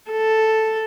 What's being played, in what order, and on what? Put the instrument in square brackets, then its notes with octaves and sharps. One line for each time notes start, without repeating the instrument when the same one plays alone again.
[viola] A4